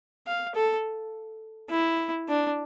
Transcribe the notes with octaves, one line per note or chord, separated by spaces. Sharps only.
F5
A4
E4
D4